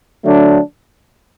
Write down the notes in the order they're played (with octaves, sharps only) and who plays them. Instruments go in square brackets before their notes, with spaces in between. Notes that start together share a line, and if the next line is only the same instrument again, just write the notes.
[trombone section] D3 F#3 A3 D4